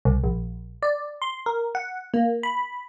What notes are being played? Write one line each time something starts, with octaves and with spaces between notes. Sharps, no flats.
C2
A#1
D5
C6
A#4
F#5
A#3
B5